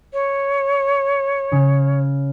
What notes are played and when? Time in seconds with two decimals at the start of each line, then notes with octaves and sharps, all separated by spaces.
0.13 C#5
1.52 C#3 F6